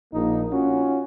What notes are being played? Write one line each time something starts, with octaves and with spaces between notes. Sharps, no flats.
A#1 A#3 D#4
C#4 F4 F#4